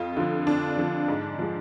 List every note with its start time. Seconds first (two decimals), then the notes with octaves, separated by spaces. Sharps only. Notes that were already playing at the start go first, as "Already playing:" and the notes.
Already playing: F2 F4
0.16 D3 F3 F4
0.46 F2 D4
0.77 D3 F3
1.08 G#2
1.39 F3 G#3